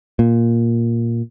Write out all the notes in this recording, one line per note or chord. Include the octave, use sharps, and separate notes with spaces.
A#2